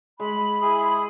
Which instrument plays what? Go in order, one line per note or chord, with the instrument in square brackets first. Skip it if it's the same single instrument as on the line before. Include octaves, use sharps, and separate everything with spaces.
[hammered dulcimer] G#3 [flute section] B5
[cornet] E4 [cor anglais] G#4